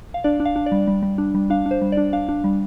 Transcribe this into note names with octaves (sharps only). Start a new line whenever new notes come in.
F5
D4 D5
D4
F5
D4
D5
G3
G3
G3
D4
G3
D4 F5
D4
C5
G3
D4 D5
D4 F5
D4
G3